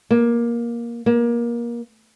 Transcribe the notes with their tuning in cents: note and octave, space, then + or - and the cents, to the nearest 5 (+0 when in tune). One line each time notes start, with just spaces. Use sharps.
A#3 +15
A#3 +25